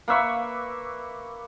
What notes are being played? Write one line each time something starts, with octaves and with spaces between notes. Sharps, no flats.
A#3 B4 E5 C#6